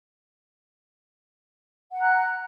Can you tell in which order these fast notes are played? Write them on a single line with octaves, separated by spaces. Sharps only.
F#5 A#5 F#6